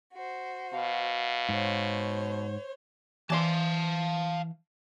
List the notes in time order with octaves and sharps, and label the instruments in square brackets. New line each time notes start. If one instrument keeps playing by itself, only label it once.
[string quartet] F#4 C5
[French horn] B2 [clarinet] F5
[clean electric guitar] G#2 [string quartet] C5 C#5
[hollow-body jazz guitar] E3 D5 C6 [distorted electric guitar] F5 A5